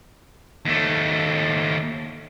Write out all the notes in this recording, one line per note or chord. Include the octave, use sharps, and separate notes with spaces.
D#2 A3